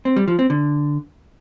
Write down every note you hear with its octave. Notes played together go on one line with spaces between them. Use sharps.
C4
G3
F3
C4
D3